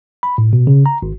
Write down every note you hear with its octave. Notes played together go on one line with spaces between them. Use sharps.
B5
A2
B2
C#3
A#5
G#1